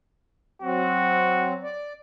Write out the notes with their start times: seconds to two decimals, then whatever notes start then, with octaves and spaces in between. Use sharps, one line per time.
0.63 F#3 C4 F#4
1.63 D5